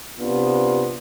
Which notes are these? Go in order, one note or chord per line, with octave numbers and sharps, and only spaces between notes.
C3 B3 D4 F4